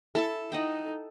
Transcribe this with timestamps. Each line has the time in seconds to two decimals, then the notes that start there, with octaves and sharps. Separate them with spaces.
0.15 E4 A4 E5 A5
0.52 D#4 D#5 F#5 G5